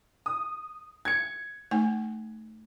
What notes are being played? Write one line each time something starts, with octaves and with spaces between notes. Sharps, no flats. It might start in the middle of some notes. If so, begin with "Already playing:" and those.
D#6
G#6 C#7
A3 D#4 G#5